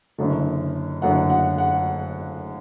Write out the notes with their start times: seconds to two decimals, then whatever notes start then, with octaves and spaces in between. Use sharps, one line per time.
0.18 F#1 F#2 D3
1.01 F#1 F#2 D3 F#5
1.30 F#5
1.58 F#5